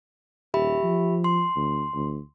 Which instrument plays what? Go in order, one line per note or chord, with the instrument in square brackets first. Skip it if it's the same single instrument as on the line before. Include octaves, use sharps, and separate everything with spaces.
[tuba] D#1 [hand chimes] G4 E5 B5
[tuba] F3
[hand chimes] C6
[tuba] D2
D2